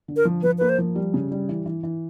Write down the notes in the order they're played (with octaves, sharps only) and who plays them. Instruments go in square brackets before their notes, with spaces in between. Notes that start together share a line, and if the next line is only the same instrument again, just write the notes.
[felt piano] D3
[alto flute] A#4
[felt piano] F3
[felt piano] F3 [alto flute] B4
[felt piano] A#3 [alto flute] B4
[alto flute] C5
[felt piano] F3
G3
C#3
G3
E3
E3
E3